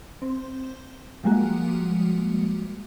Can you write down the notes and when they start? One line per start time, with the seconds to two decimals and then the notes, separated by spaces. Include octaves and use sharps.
0.22 C4
1.24 F3 G3 G#3 A#3 F#4